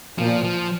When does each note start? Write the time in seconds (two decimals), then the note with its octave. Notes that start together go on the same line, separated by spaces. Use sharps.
0.18 A#2 F3
0.44 F3